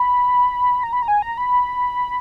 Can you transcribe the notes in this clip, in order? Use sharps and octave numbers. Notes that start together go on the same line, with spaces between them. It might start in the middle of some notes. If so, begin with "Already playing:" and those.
Already playing: B5
A#5
B5
A#5
G#5
A#5
B5